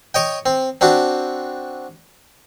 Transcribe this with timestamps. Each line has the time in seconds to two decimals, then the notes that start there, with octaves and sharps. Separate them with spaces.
0.14 C#5 D#5 G5
0.46 C4
0.81 C4 D4 F#4